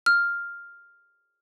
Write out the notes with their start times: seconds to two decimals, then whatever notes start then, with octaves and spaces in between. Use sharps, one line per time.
0.06 F6